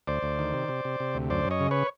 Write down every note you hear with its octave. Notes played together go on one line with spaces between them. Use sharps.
D2 C5 D5
D2
D#3
C3
C3
C3
C3
D2
F#2 C5 D5
F#2
C#5 D#5
C#3
B4 C#5